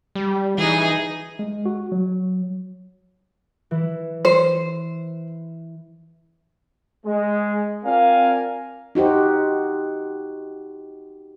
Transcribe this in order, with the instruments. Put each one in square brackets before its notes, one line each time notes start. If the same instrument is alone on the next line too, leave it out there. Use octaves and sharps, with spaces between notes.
[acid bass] G3
[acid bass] E3 [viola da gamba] D#4 G#4
[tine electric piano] G#3
F#4
F#3
[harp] E3 E4
[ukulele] C5
[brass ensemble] G#3
C4 F4 A#4 D5 F5 G#5
[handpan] D#4 F#4 G4 C5